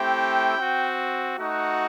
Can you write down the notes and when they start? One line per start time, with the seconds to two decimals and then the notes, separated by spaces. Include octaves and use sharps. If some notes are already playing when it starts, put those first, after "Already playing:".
Already playing: A3 C4 E4 G4 G5
0.58 C4 F#4
1.37 A3 D#4 F#4